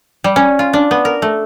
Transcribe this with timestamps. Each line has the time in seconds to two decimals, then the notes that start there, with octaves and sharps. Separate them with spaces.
0.24 G3
0.36 C#4
0.59 F4
0.73 D4
0.91 B3
1.05 A#4
1.22 A3